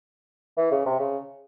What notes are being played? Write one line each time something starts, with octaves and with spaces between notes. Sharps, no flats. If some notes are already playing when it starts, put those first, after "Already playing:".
E3
C#3
C3
C#3